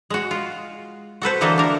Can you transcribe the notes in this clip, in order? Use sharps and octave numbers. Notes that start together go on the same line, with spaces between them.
G#3 F#4
F4
F#4 A4 B4 C5
D3 E3 A#3 A4 B4 D#5
D4 A#4